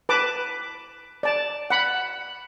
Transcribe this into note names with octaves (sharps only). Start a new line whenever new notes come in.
B4 A5 D6
D5 A5
F#5 B5